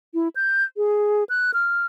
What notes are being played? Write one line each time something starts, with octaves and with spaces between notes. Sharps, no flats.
E4
G6
G#4
F#6
F6